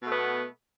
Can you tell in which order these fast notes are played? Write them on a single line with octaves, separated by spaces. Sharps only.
B2 A3 B3